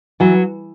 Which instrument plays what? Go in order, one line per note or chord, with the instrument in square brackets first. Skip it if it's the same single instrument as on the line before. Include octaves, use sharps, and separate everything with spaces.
[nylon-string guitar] E3 F#3